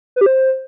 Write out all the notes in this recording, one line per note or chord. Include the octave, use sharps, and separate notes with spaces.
B4
G4
C5